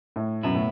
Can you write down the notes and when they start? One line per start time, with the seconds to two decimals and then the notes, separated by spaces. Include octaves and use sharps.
0.16 A2
0.43 F#2 B2 B3 E4
0.54 A2